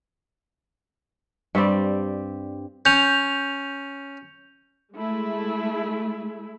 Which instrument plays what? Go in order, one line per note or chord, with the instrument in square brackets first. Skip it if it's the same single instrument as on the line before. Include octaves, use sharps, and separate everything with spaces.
[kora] G2 G3 C4 D5
[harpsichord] C#4 [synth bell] G6 F7
[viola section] G#3 A3 E4